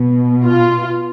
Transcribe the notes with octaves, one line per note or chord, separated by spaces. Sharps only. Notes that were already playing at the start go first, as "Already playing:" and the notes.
Already playing: B2
F4